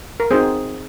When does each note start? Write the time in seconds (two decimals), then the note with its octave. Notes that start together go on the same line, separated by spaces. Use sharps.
0.20 A#4
0.31 C4 D#4 F#4 G#4 C5